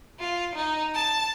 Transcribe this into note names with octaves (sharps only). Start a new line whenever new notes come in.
F4
D#4
A5